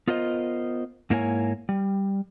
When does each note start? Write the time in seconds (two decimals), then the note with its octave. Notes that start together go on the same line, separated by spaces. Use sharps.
0.08 B3 F4 A#4 C5 D#5
1.10 G#2 A#3 E4 A#4 C#5 G#5
1.69 G3